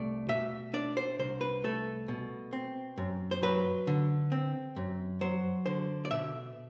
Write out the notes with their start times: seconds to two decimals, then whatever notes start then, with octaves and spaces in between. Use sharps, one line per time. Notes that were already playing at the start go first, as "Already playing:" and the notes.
Already playing: C2 A3 D5
0.29 B2 E5
0.74 D4 D5
0.97 C5
1.19 C2 C5
1.41 B4
1.64 A3 A4
2.08 B2
2.53 C4
2.98 F#2
3.31 C5
3.43 F#3 B4
3.87 D3
4.32 C4
4.76 F#2
5.21 F#3 C5
5.66 D3 C5
6.05 D5
6.11 B2 E5